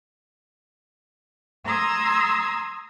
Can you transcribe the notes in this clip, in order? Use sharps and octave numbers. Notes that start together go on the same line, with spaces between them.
A#5 C6 D#6 E6 G#6